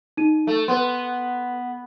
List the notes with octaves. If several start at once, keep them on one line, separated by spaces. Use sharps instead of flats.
D#4 D#7
A3
B3 B4 C6